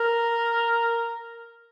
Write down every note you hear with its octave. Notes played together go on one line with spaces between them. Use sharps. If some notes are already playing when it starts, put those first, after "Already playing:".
Already playing: A#4